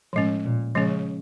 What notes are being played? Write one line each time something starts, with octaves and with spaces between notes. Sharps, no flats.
A2 F3 G#3 C#4
A#2
C#3 F3 G#3 C#4